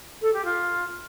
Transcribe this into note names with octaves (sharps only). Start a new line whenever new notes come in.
A4
G4
F4